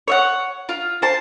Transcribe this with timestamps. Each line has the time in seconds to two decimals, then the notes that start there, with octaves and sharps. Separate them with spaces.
0.08 C#5 E5 F#5
0.69 F4
1.02 C5 A5